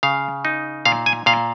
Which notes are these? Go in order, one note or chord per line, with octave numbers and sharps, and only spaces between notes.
C#3 F5
D#4
A#2 F5
G#5
A#2 F5